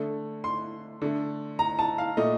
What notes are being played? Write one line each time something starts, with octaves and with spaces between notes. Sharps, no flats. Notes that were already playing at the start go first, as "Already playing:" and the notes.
Already playing: D3 A3
C6
D3 A3
A#5
A5
F5
A#2 A3 D#5